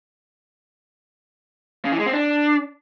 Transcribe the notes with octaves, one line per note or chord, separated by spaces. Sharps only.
C#3
E3
G#3
C4
D4